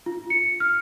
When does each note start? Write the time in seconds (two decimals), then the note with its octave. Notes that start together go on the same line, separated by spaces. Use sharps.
0.06 F4
0.30 C#7
0.60 F6